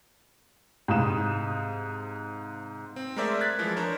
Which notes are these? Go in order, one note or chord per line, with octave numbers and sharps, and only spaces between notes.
G#2 C3 F5 D#6 E7
C4
G#3 A3 A#4 C5 D5 E5
F#6 G#6 A6 B6
E3 F3 G#3
D4 A#4 C5 C#5